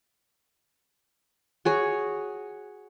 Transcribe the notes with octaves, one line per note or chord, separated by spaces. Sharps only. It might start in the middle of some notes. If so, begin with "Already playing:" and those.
F#4 G#4 C#5